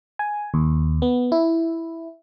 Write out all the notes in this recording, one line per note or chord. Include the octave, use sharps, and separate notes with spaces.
G#5
D#2
B3
E4